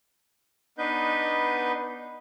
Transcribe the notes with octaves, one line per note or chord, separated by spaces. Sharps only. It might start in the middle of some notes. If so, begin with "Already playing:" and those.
B3 D4 D#4 B4 D#5 G6